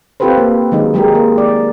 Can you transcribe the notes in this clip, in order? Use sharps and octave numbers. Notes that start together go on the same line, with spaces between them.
C4 F4 G4 A4 B4 C5
A#3
D#3 F#3 G#3 D#4
F#3 G#3 G4 G#4 A#4
A#3
D5